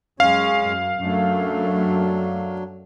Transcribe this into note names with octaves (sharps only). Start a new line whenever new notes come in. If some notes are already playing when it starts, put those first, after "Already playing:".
F#2 G#3 C#4 C#5 F5
F#2
F#2 F#3 A3 D4